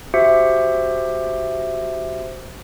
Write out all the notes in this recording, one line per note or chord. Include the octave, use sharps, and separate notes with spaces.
F#4 G4 C5 E5 C#7